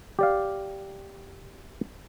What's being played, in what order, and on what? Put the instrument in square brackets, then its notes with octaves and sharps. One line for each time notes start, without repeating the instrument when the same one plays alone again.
[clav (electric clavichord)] G4 D5 F5